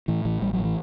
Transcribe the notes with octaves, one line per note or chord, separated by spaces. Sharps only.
A2 E3
A1 E3
A1 G3
F#3
A2
E3